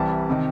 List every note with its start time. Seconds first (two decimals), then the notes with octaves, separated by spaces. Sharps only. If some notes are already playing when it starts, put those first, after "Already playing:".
Already playing: C2 C3 E3 G3 A5
0.30 C3 D#3